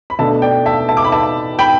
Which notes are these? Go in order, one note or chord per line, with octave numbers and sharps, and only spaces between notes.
B5
B2 A3 D4 E5 A5
D5 G5
E5 A5
E5 A5
D6
B5
E5 A5
G5 B5